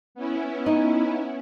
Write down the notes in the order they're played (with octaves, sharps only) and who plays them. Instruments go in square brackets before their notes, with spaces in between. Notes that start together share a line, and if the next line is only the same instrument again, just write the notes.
[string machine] B3 C#4 E4
[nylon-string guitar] D#4